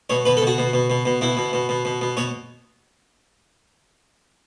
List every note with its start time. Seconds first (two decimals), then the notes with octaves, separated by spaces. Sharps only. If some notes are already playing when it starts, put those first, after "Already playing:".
0.10 B2 C#5
0.25 B2 B4
0.37 A4
0.42 B2 F#4
0.58 B2
0.73 B2
0.90 B2
1.06 B2
1.21 B2 E4
1.37 B2
1.53 B2
1.69 B2
1.85 B2
2.01 B2
2.17 B2 C#5